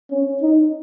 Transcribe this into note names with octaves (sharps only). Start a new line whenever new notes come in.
C#4
D#4